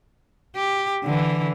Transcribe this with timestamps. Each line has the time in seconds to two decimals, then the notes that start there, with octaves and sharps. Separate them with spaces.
0.56 G4
1.04 D3 E3